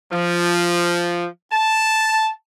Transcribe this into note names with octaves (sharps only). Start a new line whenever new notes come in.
F3
A5